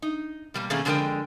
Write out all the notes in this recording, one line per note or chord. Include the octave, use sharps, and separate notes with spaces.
D#4
B2 G3 A#3
B2 D#3 A3 A#3 C#4 G#4
F2 D3 G#3 F#4 A#4 G5